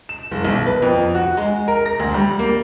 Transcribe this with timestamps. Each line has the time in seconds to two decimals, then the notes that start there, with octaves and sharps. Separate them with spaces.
0.09 E7
0.31 F#1
0.45 B1
0.67 B4
0.82 F2
1.15 F#4
1.37 G#3
1.68 A#4
1.86 A#6
1.99 D2
2.14 G3
2.39 A#3